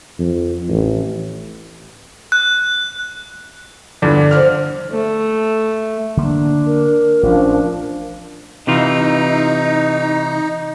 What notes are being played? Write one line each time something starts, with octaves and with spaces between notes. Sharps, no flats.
F2
A1
F#6
E2 G2 D3 E3 F3
E3 F3 F4 F6
A3
D3 A#3 D4
A#4
A1 F3 C#4 D4
C3 E3 D#4 F4